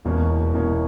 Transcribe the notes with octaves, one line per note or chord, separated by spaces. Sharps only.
E1 E2 B2 A#3 C#4
E1 E2 B2 A#3 C#4